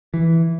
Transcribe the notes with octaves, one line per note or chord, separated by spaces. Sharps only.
E3